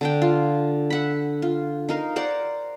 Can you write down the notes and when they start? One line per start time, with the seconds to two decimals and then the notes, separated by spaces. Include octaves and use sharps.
0.01 D3 D4 G5
0.22 F4
0.90 E5 F#5 B5
1.42 F4
1.89 D#4 A#4 F5
2.16 A#4 C5 D5 F#5